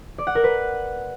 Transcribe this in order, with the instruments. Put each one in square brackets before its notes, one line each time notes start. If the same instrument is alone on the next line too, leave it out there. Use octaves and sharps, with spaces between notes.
[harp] D5
F#5
A#4
B4